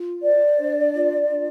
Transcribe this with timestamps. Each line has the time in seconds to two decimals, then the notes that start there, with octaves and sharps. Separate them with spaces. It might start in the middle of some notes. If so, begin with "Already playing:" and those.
Already playing: F4
0.22 C5 D5
0.57 D4
0.95 F4
1.30 D4